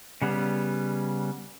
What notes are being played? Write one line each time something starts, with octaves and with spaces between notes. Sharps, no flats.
C#3 G3 B3 C#4